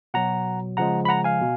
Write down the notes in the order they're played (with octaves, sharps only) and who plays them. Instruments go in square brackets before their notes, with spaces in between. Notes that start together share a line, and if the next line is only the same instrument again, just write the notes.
[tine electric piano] B2 F#3 F#5 A#5
C#3 F3 G#3 F#5 A#5
B5
F#5 A#5
F5 G#5
B2